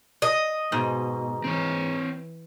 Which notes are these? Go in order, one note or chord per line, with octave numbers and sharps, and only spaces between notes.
D#5
G#2 B2
E3 C4 C#5